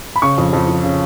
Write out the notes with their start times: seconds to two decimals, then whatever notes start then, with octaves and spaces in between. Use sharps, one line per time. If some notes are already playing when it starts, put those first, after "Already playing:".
0.16 B5
0.22 C#3 C#6
0.38 F2
0.53 F2
0.68 F3
0.83 C#3